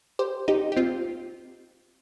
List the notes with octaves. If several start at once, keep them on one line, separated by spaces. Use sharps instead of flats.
G4 C5
D#4 G4
G4
C4 F4